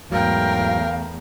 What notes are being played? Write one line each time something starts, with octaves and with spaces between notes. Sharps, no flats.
E2 G#2 F#3 A3 A#4 F5 G5